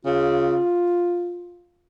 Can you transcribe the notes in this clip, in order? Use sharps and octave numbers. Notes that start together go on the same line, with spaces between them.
C#3 F4